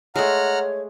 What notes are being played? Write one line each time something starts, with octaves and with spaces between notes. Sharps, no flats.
G#3 A3 C#5 F#5 A#5 F6